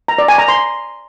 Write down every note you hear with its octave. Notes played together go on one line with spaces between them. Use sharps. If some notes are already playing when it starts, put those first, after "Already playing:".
A#5
D5
G#5
A#5
C6